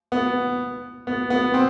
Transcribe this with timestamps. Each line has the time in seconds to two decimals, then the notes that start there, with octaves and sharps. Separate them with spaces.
0.12 B3
1.07 B3
1.30 B3
1.54 C4